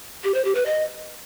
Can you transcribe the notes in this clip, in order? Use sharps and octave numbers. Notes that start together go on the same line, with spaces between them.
G4
C5
G4
B4
D#5